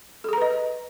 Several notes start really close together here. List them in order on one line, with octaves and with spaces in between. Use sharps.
A4 G#4 A#5 B4 D#5